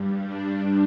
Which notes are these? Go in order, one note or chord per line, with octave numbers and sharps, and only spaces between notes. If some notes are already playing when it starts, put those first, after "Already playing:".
Already playing: G2 G3
D4